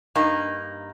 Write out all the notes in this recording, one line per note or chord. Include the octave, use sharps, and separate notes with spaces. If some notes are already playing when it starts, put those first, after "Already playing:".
G2 A#3 D#4